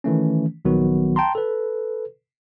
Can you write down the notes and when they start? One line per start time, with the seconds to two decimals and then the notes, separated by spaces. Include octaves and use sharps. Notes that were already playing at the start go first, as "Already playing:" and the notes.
0.04 D#3 E3 A3 C#4
0.65 A#1 D#3 F#3 B3 F#4
1.16 G5 A5 A#5 C6
1.35 A4 B4